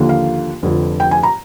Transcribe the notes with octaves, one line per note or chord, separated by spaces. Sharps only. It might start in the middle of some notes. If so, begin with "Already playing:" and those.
Already playing: D#2 D3 F3 A#3
F5
F1 F2 D3
G5
G#5
A#5